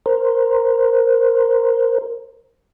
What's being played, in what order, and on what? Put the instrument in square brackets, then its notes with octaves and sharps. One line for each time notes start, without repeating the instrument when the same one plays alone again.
[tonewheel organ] A#4 C5